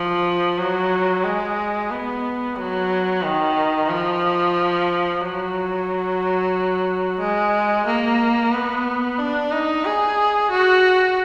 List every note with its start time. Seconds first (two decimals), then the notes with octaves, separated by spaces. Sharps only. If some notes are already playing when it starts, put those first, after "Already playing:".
Already playing: F3
0.58 F#3
1.24 G#3
1.90 B3
2.56 F#3
3.22 D#3
3.89 F3
5.21 F#3
7.19 G#3
7.86 A#3
8.52 B3
9.18 D4
9.52 D#4
9.85 G#4
10.50 F#4